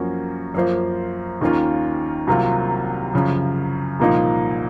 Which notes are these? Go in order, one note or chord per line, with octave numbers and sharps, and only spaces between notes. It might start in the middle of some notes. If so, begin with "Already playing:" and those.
Already playing: F#2 F3 A#3 C#4 F#4
F#2 F3 A#3 F4 C5
D#2 D#3 A#3 C#4 F4
C2 C3 F#3 A#3 F4
F#2 C#3 F3
C2 A#2 F3 A#3 D#4